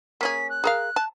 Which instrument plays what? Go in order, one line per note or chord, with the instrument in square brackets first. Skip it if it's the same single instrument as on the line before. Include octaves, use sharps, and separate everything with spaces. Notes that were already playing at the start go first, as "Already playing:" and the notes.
[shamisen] A#3 C#4 G#4 [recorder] B6
[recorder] F#6
[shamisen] G#4 A#4 F5
A5